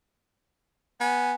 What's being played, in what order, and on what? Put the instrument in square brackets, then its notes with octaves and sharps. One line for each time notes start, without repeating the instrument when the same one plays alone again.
[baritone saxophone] B3 [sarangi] G#5